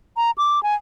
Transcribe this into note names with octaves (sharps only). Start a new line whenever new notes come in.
A#5
D6
G#5